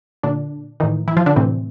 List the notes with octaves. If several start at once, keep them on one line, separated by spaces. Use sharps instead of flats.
A#2 D3 D4
A2 D#3 E3 D#4
E3 E4
F3 F4
D3 D4
A2 C3 E3 C4